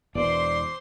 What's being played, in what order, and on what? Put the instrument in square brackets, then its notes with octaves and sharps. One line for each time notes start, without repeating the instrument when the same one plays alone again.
[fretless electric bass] E1 E2 B2 [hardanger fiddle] C5 C6 [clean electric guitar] D5 [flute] D6